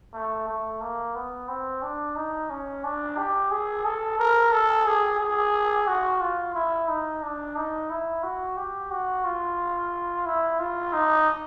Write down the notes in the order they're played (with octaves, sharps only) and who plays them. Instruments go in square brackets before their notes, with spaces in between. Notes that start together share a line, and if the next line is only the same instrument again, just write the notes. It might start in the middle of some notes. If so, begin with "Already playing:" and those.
[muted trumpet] A3
A3
A#3
B3
C4
D4
D#4
C#4
D4
G4
G#4
A4
A#4
A4
G#4
G#4
F#4
F4
E4
D#4
D4
D#4
E4
F#4
G4
F#4
F4
E4
F4
D#4